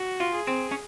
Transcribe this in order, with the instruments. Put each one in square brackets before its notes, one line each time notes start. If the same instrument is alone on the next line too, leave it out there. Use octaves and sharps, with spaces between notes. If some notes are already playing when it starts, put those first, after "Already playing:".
Already playing: [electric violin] F#4
[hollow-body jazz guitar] F4
[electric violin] G#4
[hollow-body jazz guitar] C4
C#4